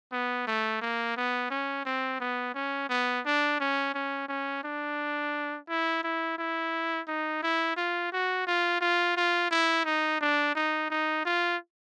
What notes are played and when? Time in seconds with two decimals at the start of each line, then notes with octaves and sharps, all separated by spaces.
0.12 B3
0.47 A3
0.82 A#3
1.17 B3
1.50 C#4
1.85 C4
2.20 B3
2.55 C#4
2.89 B3
3.25 D4
3.60 C#4
3.94 C#4
4.29 C#4
4.64 D4
5.69 E4
6.04 E4
6.38 E4
7.08 D#4
7.43 E4
7.77 F4
8.12 F#4
8.47 F4
8.81 F4
9.17 F4
9.51 E4
9.85 D#4
10.21 D4
10.55 D#4
10.90 D#4
11.25 F4